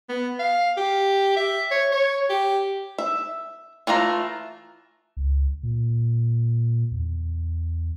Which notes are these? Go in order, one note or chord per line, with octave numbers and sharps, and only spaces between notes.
B3
F5
G4
E5
C#5
C#5
G4
E5
E3 A3 F4 A#5
C#2
A#2
E2